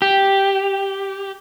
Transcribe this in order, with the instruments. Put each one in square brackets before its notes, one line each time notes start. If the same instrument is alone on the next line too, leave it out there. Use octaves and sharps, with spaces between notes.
[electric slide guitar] G4